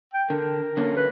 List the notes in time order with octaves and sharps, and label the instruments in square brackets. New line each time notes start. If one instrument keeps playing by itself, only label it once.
[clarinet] G5
[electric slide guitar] D3 [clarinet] A#4
[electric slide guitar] D3 A#3 C#4
[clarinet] B4